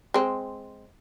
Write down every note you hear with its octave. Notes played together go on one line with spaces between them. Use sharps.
G#3 C4